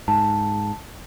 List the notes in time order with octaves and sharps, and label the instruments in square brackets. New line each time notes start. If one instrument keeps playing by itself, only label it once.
[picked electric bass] G#2 [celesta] A5